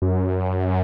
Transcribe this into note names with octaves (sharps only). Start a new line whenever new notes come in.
F#2